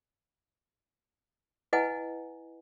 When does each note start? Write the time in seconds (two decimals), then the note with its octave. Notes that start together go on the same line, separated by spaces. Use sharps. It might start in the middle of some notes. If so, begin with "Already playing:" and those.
1.73 E4 B4 D#5 F#5 G#5